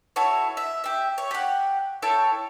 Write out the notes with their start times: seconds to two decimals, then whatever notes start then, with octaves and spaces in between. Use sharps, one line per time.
0.16 E4 F#4 A4 C#5
0.57 E5
0.84 G4 E5
1.18 C#5
1.31 G4 F#5
2.02 E4 A4 C#5 G5